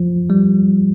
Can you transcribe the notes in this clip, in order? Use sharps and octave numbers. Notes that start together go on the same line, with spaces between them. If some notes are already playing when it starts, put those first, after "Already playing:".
Already playing: F3
G3